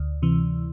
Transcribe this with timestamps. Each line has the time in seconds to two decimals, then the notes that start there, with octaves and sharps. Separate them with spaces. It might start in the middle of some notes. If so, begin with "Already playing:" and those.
Already playing: D2
0.22 C3 E3